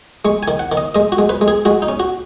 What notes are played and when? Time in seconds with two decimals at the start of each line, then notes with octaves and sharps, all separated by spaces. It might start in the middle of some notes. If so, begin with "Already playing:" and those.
0.25 G#3 C#6
0.43 G#5
0.48 D#3
0.59 F#5
0.72 D#3
0.77 D#5
0.95 G#3 D#5
1.12 F#4
1.18 G#3
1.29 B4
1.41 G#3
1.48 G#4
1.65 G#3 F#4
1.82 D#4
1.88 C#4
2.00 F#4